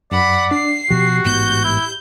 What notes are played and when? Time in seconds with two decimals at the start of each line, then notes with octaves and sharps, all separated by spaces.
0.12 F#2 D5 F#5 B5
0.51 D4 C7
0.90 B2 F3 F#4 G4
1.25 A1 G#2 B3 G6
1.64 E4